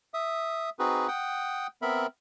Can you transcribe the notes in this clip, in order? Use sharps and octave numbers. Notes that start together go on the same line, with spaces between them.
E5 D#6
C4 D#4 F#4 G#4 B4
F#5 G5 D#6
B3 C4 A#4 E5 B5